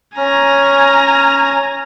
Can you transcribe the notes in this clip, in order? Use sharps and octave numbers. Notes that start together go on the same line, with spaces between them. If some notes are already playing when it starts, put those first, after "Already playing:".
C#4 G#5 A#5